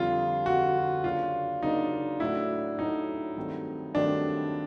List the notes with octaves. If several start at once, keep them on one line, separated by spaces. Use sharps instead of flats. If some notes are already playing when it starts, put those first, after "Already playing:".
Already playing: F2 D3 G3 F4
F2 D3 G3 F#4
C#3 F#3 A#3 D4 F4
C#3 F#3 A#3 D4 D#4
A2 F#3 A3 D4 E4 F#4
A2 F#3 A3 D4 D#4 F#4
G2 D#3 F#3 A3 C4
G2 D#3 F#3 A3 C4 D4